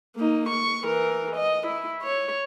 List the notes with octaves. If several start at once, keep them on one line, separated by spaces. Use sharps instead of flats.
A#3 D#4
C#6
E3 A#4
D#5
E4
C#5